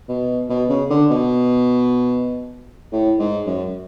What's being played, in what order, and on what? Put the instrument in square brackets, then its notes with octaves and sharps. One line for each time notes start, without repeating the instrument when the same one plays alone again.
[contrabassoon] B2
B2
C#3
D3
B2
A2
G#2
F#2